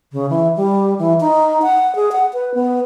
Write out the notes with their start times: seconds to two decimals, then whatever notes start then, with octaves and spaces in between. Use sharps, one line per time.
0.13 C#3
0.30 E3
0.57 G3
0.99 E3
1.21 D#4
1.62 F#5
1.95 G#4
2.12 F#5
2.33 B4
2.54 B3